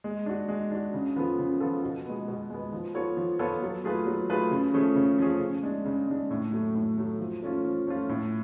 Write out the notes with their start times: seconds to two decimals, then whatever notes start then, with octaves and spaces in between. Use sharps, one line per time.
0.04 G#3
0.26 D4 F#4
0.49 G#3
0.71 D4 F#4
0.94 C#3
1.16 F3 B3 F4 A4
1.39 C#3
1.60 F3 B3 F4 A4
1.83 B2
2.05 G#3 B3
2.28 B2
2.50 G#3 B3
2.73 F3
2.94 B3 F4 A4 C#5
3.17 F3
3.39 B3 F4 A4 C#5
3.62 F#3
3.84 A3 F4 G#4 B4
4.06 F#3
4.29 A3 F4 G#4 B4
4.51 C#3
4.73 F3 A3 C#4 G#4
4.95 C#3
5.18 F3 A3 C#4 G#4
5.40 C#3
5.63 G#3 D4
5.86 C#3
6.07 G#3 D4
6.31 A2
6.53 F#3 A3
6.75 A2
6.98 F#3 A3
7.19 F3
7.42 A3 C#4 F4
7.65 F3
7.87 A3 C#4 F4
8.09 A2